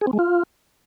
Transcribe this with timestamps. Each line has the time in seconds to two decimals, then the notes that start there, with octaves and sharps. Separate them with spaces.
0.01 G#4
0.07 C4
0.13 G#3
0.19 F4